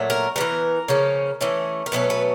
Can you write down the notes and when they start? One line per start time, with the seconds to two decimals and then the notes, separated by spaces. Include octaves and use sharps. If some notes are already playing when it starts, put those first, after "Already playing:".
Already playing: A#2 F#3 A3
0.10 A#4
0.36 G3 B3 A#4
0.41 E3
0.88 C#3 F3 A#3 C#4
1.41 E3 A3 C#4
1.86 A#4
1.92 B2 F#3 A3 C#4 B4
2.10 B4